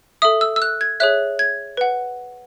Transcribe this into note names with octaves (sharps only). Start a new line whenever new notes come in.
A4 E5 D#6
E6
E6
F#6
G#6
G#4 C#5 E5 F#6
G#6
B4 F#5